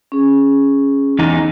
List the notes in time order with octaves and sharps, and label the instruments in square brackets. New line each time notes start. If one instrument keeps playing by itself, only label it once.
[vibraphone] C#4 G#4
[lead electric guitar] E2 D#4